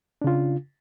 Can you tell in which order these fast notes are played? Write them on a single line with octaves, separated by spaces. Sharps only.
D4 C#3 F4